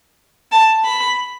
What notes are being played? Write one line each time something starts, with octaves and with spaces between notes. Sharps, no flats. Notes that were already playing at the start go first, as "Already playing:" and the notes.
A5
B5